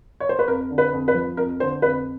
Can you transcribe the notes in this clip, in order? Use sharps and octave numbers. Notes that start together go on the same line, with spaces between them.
C#5
C5
B4
F2 A#4
D3
B4
F2
B4
F3
F2 A#4
D3 C5
F2 B4